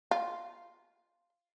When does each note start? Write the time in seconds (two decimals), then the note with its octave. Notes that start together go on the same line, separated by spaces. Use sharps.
0.11 F4